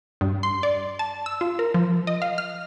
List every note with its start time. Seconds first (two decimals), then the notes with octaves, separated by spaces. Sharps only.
0.21 G2
0.43 C6
0.63 D5
0.99 A5
1.26 E6
1.41 F4
1.59 A#4
1.74 F3
2.07 D#5
2.22 F5
2.38 F6